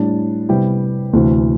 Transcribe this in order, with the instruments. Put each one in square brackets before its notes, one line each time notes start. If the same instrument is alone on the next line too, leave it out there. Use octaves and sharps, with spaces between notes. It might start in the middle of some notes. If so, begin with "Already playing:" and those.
Already playing: [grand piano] A2 G3 D4
C3 G3 B3 E4 G4
D2 C3 E3 A3